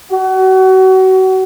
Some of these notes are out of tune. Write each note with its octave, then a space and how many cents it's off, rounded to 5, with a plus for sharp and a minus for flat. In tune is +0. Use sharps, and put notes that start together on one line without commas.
F#4 +30